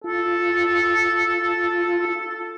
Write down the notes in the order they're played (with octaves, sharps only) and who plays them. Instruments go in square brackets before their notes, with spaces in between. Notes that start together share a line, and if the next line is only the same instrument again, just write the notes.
[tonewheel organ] F4 [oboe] A4